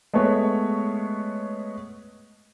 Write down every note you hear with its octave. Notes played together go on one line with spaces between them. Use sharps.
G#3 A3 B3 C#5